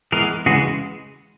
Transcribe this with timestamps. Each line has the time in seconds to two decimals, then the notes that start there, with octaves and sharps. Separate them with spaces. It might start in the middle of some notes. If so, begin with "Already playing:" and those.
0.12 E3 G#3 B3 G#4 A#4
0.46 C#3 E3 G#3 F#4 G#4